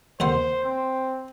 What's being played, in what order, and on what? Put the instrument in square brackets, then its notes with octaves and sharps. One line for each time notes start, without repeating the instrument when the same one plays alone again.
[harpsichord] D#2 F#5 C6 [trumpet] C5
[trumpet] C4